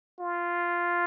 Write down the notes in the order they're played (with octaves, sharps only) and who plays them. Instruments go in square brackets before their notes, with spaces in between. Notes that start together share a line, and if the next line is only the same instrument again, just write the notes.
[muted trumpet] F4